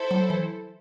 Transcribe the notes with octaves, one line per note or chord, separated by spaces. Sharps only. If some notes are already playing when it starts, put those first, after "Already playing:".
Already playing: E4 A4 C5
F#3
E3